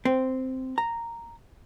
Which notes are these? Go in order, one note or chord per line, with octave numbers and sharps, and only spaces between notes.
C4
A#5